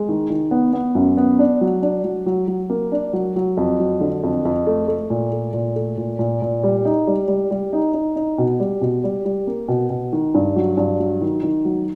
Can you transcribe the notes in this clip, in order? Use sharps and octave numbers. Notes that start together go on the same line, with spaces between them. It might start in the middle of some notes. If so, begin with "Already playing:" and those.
Already playing: G#3
D#3
D#3
B3
B3
F#2
B3
D4
F#3
D4
F#3
F#3
F#3
A#3
D4
F#3
F#3
F2
F#3
D3
F2
F2
A3
A3
A#2
A3
A#2
A3
A#2
A#2
A#2
G3
D#4
G3
G3
G3
D#4
D#4
D#4
B2
G3
B2
G3
G3
A#3
B2
B2
D#3
G2
F#3
G2
F#3
D#3
D#3
F#3